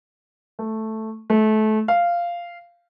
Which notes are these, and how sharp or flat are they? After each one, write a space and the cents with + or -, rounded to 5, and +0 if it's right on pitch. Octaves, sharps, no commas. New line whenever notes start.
A3 +0
A3 -25
F5 -10